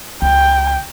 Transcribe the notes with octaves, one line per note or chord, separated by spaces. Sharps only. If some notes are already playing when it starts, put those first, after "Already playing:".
C#2 G5